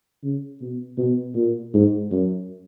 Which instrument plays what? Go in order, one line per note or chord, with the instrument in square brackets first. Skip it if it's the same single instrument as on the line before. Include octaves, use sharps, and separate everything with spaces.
[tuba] C#3
B2
B2
A#2
G#2
F#2